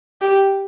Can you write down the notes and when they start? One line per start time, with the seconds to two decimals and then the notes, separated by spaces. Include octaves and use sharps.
0.21 G4